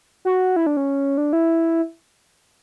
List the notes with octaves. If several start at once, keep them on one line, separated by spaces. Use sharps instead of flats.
F#4
E4
D4
C#4
D4
E4